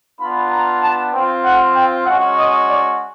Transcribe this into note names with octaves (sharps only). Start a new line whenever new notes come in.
B3 D4 F4 B5
A#5
A5
C4 F4 G5
F#5
G5
G#3 C#4 F#4 F#5
D#5
D5